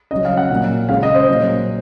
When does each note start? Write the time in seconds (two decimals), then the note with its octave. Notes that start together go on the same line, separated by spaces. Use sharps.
0.11 C#3 F#3 D#5
0.25 F5
0.37 F#5
0.50 A#2 F#3
0.89 C#3 G#3 F5
1.03 D#5
1.15 C5
1.29 A#2 F#3